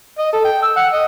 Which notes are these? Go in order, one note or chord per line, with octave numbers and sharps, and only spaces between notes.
D#5
A4
G5
E6
F#5
D#5